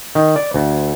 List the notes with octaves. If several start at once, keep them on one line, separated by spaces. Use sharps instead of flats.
D#3
D5
D2